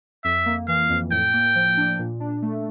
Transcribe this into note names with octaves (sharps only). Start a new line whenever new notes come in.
F2 E5
A#3
E3 F5
F2
A2 G5
A#3
F3
D4
A#2
D4
A3